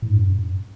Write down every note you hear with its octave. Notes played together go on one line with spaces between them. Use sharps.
A2
G2
F#2